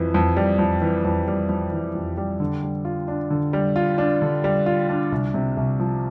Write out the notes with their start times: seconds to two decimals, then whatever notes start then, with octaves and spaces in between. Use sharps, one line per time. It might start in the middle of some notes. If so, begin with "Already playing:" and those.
Already playing: F2 E3
0.14 F2
0.37 G3
0.59 F2
0.82 E3
1.05 F2
1.28 G3
1.49 F2
1.72 E3
1.95 F2
2.17 G3
2.40 D3
2.63 G3
2.85 F4
3.08 D4
3.30 D3
3.53 G3
3.76 F4
3.98 D4
4.22 D3
4.44 G3
4.66 F4
4.89 D4
5.12 C2
5.34 C3
5.57 C2
5.79 F3